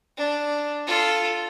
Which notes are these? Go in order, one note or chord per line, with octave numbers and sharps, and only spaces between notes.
D4
F4 A4